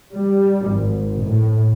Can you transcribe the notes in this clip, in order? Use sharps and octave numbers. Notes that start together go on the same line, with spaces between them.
G3
G#1
A2